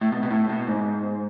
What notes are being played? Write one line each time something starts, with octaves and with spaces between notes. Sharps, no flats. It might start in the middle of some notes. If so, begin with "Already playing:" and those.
A2
B2
B2
A2
B2
G#2